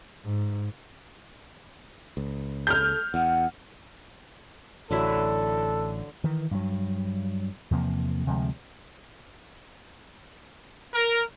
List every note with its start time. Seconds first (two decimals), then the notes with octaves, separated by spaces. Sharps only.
0.24 G#2
2.17 C#2
2.67 A4 F6 G6
3.14 E2 F#5
4.91 A1 D3 F#3 E4 A4
6.24 D#3 E3
6.51 G2 F#3
7.71 E2 C3 F3 A#3
8.26 D2 C3 F3 G#3
10.94 A#4